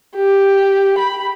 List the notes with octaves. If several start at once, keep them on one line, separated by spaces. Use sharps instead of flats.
G4
B5